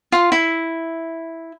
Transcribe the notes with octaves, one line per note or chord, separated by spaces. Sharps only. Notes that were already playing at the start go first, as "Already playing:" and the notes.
F4
E4